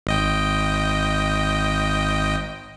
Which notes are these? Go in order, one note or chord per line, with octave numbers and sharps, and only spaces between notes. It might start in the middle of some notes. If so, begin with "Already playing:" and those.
G#1 D#5 G5